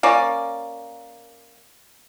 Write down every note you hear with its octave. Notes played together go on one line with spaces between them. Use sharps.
A#3 C#4 D5